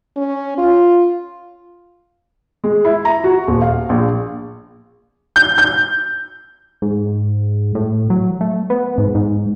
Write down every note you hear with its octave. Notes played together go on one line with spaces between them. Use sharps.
C#4
F4
G#3
E4
A#5
F#4
D#1
F5
A#1
G6
G6
G#2
A2
F#3
A3
B3
G#2
G#2